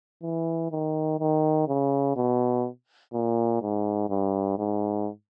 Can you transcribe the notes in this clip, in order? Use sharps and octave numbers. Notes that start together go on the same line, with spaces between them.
E3
D#3
D#3
C#3
B2
A#2
G#2
G2
G#2